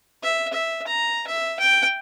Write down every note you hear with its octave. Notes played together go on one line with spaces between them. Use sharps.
E5
E5
A#5
E5
G5